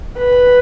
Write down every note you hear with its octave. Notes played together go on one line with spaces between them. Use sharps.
B4